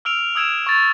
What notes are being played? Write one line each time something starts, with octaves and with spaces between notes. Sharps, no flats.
E6 F6 D7 F7
D#6 E6 G#6 D7 E7
C#6 A6 F7